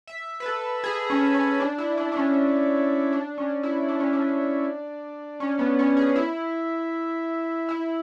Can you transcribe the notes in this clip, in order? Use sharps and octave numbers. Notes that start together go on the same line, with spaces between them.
E5
B4
A4
G#4
C#4
C#4
D4
E4
D4
D4
C#4
D4
C#4
E4
D4
C#4
D4
C#4
B3
C#4
G#4
E4
E4